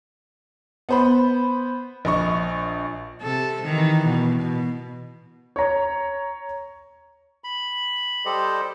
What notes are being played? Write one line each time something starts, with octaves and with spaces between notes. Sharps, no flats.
B3 C5 B5
A#1 D#5 C#6
C3 A4
D#3 E3
B2
B2
C#5 A#5
B5
G3 G4 A4 C5 D#5